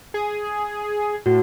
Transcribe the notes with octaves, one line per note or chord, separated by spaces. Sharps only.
G#4
A2 F#4